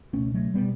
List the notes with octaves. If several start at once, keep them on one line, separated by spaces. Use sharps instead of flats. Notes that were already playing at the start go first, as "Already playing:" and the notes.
C#2 B2 A3 C#4
F#3 A3
B2 G3 B3